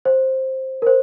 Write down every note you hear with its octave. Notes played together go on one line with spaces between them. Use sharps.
C5
A#4
C5